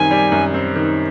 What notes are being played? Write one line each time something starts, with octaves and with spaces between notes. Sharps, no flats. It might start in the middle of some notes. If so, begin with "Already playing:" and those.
Already playing: F#2 D#3 G3 C4 G#5
G3
F#2
C4
D#3